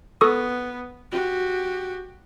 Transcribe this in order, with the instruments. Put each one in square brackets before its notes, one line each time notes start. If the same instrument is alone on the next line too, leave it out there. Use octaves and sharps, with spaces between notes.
[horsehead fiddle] B3 [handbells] A4 C#6 D#6
[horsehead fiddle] F#4 G4